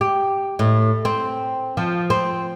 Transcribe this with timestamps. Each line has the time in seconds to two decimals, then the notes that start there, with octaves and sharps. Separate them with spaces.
0.01 G4
0.59 A2
1.05 C4
1.77 F3
2.10 C4